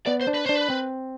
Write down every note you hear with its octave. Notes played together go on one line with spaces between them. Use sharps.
B3 D5
C5
D4
B4
D4 C5
B4
C4